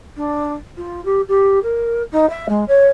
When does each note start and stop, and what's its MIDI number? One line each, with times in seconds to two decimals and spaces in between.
0.16 0.53 62
0.77 1.03 65
1.05 1.21 67
1.28 1.59 67
1.62 2.02 70
2.11 2.28 63
2.29 2.46 76
2.48 2.64 56
2.68 2.86 73